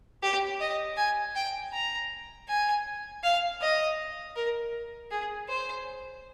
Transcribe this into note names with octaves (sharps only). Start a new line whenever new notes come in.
G4
D#5
G#5
G5
A#5
G#5
F5
D#5
A#4
G#4
C5